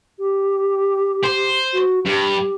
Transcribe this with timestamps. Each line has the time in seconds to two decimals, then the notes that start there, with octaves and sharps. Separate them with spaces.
0.18 G4
1.24 C5
1.73 F#4
2.06 G2 G4